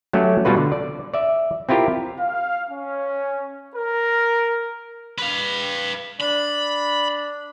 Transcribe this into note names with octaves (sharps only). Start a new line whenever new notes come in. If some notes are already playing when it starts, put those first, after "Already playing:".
F#3 A3 C#4 F#4 G4
B2 G3 F4 F#4 B4
D3
D5
D5 E5
C4 E4 F4 G4 A#4
F5
C#4
A#4
B4 F5
D4 B5